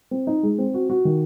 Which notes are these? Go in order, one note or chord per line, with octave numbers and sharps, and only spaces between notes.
C4
D#4
G#3
C4
F#4
F#4
D#3